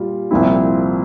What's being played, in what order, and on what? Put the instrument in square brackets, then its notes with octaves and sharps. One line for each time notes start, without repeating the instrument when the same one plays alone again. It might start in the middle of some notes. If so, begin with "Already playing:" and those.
Already playing: [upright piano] A#2 G3 F4
C2 A#2 F3 C4 E4